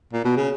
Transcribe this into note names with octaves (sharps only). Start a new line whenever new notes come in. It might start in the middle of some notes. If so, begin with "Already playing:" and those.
A#2
B2
C#3